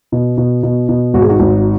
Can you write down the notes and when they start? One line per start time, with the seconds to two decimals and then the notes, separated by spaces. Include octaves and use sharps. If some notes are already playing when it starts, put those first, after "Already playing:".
0.12 B2
0.38 B2
0.63 B2
0.89 B2
1.14 G#1 F#4
1.22 G#4
1.29 D#4 F#4
1.40 G#1